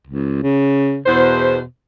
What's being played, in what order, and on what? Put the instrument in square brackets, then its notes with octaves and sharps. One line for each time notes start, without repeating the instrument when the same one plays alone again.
[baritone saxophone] C#2
C#3
[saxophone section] E2 C5 [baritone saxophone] B2